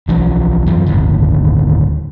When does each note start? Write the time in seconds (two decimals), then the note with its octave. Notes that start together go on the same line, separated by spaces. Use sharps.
0.08 B1 E3 F3
0.66 F#2 E3 F3
0.86 D1 G1 D#2 D3